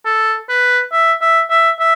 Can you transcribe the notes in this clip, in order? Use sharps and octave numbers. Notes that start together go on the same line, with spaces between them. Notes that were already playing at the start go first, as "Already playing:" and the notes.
A4
B4
E5
E5
E5
E5